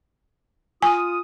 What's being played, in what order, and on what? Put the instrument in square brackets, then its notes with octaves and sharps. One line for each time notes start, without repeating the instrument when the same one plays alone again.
[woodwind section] F4 D#6 [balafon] G#5